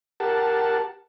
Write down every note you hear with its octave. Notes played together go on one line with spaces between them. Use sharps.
G4 A#4 F#5 A5